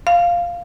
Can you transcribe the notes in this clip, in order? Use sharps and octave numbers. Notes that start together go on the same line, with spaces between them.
F5